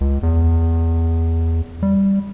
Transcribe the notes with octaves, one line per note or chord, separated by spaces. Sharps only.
C#2
E2
G3